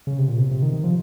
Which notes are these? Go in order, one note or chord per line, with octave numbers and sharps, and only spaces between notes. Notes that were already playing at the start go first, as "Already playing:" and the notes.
C#3
C3
A#2
C3
C3
D#3
D#3
F3